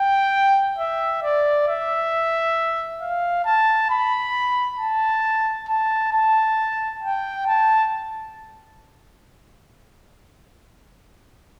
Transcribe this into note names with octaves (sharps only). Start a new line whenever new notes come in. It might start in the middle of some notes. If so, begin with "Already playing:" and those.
Already playing: G5
E5
D5
E5
F5
A5
B5
A5
A5
A5
G5
A5